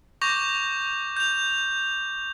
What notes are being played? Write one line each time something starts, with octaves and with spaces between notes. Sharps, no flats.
C#6 D6 G6 A#6 F7
G6 F7